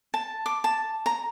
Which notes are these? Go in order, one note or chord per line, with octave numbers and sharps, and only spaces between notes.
A5
D6
A5
A#5